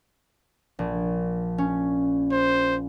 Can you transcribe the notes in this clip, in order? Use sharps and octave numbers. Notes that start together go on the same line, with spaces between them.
A#1
C#4
C5